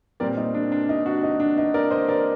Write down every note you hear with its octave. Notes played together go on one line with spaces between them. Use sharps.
A#2 G3 C4 A#4 D5
D#4
D4
D4
D#4
D4 F#4
D#4
D4
D#4
A#4 D5
C5 D#5
A#4 D5